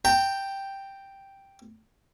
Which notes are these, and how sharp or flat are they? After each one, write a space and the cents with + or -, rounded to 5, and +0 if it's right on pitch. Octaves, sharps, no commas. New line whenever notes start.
G5 +0 A#5 -45